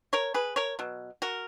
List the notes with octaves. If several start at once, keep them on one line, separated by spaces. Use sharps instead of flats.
A#4 C#5
G#4 B4
A#4 C#5
B2 F#3
F#4 A#4